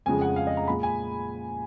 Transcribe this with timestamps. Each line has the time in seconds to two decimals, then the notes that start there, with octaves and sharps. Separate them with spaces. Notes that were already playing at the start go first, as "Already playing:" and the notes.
0.06 F2 C#3 G#3 G#5
0.21 F#5
0.36 F5
0.47 D#5
0.57 A#5
0.67 A#2 G#3 B5
0.83 G#5